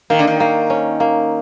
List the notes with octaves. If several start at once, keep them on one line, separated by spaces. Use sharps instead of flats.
D#3 A#3
D3
D#3
A#3
C#4
A#3